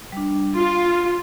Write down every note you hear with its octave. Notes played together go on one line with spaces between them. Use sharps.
G3 D4
F4 C6